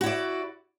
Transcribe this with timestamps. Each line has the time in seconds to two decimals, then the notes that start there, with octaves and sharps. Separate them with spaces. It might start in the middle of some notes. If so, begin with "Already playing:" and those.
0.01 F#4
0.03 E4
0.06 D5